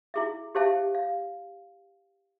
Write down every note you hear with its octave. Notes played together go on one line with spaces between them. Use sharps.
E4 G#4 E5
G4 G#4 C5 E5 F5 A5
F5